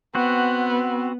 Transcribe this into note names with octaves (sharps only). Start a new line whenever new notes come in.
B3 C4 F#4